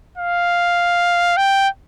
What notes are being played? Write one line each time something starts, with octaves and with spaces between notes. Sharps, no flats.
F5
G5